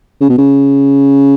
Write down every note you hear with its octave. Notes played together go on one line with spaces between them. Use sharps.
C#3
B2
C#3